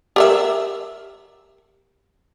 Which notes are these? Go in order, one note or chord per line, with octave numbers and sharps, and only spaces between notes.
G4 A#4 E5